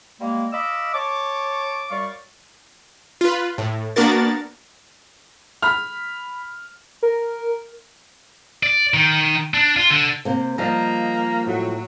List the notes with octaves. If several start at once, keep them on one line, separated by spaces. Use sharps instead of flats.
G3 G#3 A#3
D#5 F5 B5 D6 E6
C#5 A5 D6
F#2 G3 D5 F5 C#6
F4 B4
A2
A#3 B3 D4 F#4 A#4 A6
B5 F6
A#4
D5
D#3
D4
F4
D3
C3 A#3 C5
F3 G3 A#3 D#5 A#5
A2 F#3 F#4